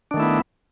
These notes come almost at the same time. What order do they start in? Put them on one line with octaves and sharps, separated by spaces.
D4 D#3 A3 E4 B3